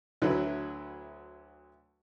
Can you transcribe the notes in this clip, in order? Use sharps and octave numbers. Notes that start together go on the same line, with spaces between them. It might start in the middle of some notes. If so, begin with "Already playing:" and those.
D2 D3 F#3 E4 B4